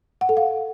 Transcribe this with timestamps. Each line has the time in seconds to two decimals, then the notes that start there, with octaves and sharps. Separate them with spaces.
0.21 F#5
0.29 A4
0.37 F5